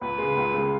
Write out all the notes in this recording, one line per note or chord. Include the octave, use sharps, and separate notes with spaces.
C#2 B4
C#3 G#3
C#2
C#3 G#3